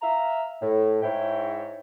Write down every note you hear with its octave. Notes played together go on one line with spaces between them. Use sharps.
E5 F5 A#5
A2
G#2 E4 C#5 G5